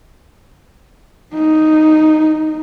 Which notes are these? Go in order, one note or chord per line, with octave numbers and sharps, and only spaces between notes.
D#4